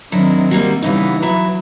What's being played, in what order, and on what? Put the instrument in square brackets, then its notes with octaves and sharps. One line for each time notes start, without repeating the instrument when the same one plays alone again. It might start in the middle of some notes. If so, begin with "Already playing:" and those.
[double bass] D#3 C4 [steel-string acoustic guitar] F#3 D4 E4
[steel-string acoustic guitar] G3 A#3 F#4
[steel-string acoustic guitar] C#3 B3 D#4 [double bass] E3 G3
[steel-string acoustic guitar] E3 E4 A#5 [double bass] F#3